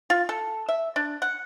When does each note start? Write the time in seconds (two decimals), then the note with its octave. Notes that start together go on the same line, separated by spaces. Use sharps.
0.10 F4
0.29 A4
0.69 E5
0.96 D4
1.22 F#5